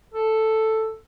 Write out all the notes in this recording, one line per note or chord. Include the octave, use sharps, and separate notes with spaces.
A4